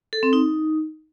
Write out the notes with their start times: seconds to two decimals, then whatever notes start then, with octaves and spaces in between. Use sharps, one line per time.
0.13 A4
0.23 C4
0.33 D#4